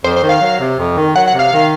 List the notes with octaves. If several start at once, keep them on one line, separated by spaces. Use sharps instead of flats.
F2 C5
C5
D#3
F5
F#3
C3
F2
D#3
F#3 F#5
F#5
C3
F5
D#3